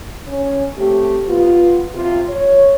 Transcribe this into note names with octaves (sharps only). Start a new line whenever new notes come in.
C#4
A3 C4 G4
B3 F4
C3 F4
C#5